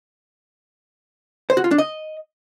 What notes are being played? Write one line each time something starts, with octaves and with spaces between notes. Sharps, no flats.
C5
F#4
F4
D4
D#5